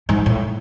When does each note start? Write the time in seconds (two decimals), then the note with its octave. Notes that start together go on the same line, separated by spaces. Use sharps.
0.09 G#2
0.26 A2